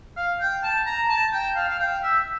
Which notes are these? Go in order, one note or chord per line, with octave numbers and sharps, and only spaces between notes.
F5
G5
A5
A#5
A5
G5
F5
F5
G5
E5